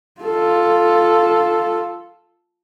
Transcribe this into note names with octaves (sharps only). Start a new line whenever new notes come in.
F4 A4